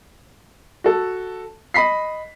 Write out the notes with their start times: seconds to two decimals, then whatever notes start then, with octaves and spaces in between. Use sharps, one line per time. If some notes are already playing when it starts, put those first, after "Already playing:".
0.84 F#4 A4
1.74 D#5 B5 B6 C7